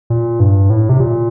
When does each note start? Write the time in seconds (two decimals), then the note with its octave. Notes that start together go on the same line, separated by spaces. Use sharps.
0.10 A#2
0.40 G2
0.70 A2
0.89 C3
1.00 A#2